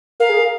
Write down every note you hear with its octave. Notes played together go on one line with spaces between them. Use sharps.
A#4 F5
G#4
A#4